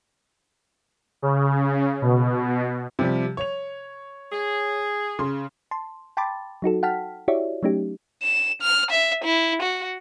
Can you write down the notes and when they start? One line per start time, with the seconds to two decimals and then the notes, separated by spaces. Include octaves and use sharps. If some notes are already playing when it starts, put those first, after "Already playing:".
1.22 C#3
2.02 B2
2.99 C3 F3 G3
3.37 C#5 F7
4.32 G#4
5.19 C#3 C6
5.71 A5 C6
6.17 G5 A5 B5 C6 D6 A6
6.62 F#3 D#4 F#4 A4
6.83 F#5 G5 A5 F6 B6
7.28 E4 F#4 G4 C#5 D5 E5
7.63 F#3 A3 C#4 D#4 G4
8.23 E7
8.62 F6
8.91 E5
9.24 E4
9.62 F#4